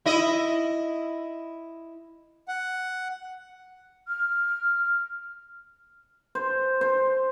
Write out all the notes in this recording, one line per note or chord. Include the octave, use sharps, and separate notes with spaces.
E4 D#5
F#5
F6
C5
C5